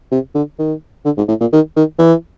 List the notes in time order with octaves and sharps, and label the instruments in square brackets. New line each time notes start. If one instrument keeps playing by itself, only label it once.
[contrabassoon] C3
D3
D#3
D3
G#2
A2
A#2
D#3
D#3
E3